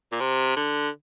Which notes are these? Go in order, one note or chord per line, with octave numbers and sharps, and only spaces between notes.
A#2
C3
D3